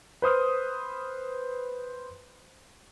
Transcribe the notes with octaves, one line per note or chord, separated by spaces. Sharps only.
B4 C5 D#6 F6